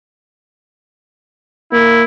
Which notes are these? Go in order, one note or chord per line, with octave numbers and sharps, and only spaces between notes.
A#3 E4